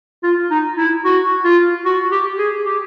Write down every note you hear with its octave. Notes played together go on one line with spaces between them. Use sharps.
F4
D#4
E4
F#4
F4
F#4
G4
G#4
G4